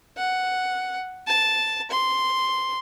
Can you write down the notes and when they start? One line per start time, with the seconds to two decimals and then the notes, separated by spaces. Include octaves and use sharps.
0.17 F#5
1.27 A5
1.90 C6